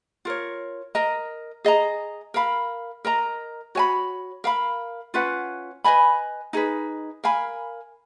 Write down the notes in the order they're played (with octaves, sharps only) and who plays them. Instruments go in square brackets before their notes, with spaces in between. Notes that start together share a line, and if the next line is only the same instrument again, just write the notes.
[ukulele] F4 A#4 C#5
A#4 D#5 A#5
G#4 D#5 A#5
A#4 F5 B5
A#4 D#5 A#5
F#4 C#5 G#5 B5
A#4 F5 B5
C#4 F4 B4 F#5
B4 D#5 G#5 B5
D#4 G#4 B4
A#4 F5 G#5 B5